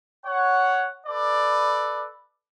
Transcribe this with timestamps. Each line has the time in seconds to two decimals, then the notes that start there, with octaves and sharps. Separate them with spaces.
0.25 C#5 F#5
1.07 A4 B4 D5